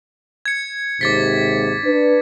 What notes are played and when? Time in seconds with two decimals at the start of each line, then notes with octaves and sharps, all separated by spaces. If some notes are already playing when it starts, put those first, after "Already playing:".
0.46 G#6 C#7
1.01 D#2 G#2 C3 D6 A6 B6
1.84 D4 B4